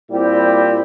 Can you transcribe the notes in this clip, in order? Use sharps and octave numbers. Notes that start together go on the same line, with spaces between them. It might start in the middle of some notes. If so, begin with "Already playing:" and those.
A#2 G3 C4 E4 G4